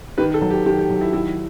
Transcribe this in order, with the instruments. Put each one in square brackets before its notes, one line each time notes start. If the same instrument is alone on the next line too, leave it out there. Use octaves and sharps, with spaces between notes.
[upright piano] D#3 [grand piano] B4
[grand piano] A4
[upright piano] F#3
[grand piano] G4
[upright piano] D#3 [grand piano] G4
[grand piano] G4
[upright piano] F#3
[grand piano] E4
[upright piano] D#3 [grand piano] E4